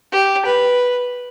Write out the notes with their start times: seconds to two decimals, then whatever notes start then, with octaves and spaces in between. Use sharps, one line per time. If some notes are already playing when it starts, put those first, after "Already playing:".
0.12 G4
0.45 B4